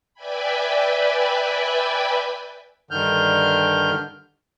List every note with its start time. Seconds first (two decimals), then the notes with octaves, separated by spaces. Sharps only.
0.14 B4 D5 E5 G5 G#5 B5
2.91 G2 D3 D#3 F6 G6